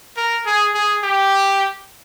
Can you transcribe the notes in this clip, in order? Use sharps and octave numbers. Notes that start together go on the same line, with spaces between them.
A#4
G#4
G#4
G4